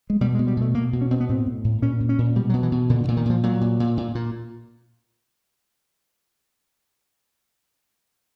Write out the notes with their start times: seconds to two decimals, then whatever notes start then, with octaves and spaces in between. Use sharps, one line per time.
0.10 G#3
0.21 B2 G3
0.35 G#3
0.39 B2
0.47 G3
0.57 B2 A3
0.74 B2 A#3
0.93 B2
1.01 C#4
1.11 B2 C4
1.20 B3
1.29 A2 C4
1.46 A2
1.64 A2
1.82 A#2 C#4
2.00 A#2
2.09 C#4
2.18 A#2
2.36 B2 G3
2.49 F#3
2.54 B2
2.63 E3
2.72 B2
2.89 A#2 D3
3.04 D3
3.08 A#2
3.17 D#3
3.25 A#2 F3
3.43 A#2 F#3
3.61 A#2
3.80 A#2
3.97 A#2
4.15 A#2